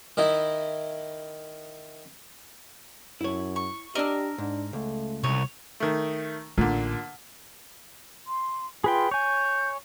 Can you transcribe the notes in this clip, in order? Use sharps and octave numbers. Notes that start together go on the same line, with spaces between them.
D#3 D#4 E4
F#2 E4 C#5
C#6
D4 G4 A#4 D5 D#5 E6
G#2 D4
C#2 A3
C2 C#5
D#3 A3
A1 A#2 D3
C6
F4 G#4 B4 G5
C#5 G#5 G6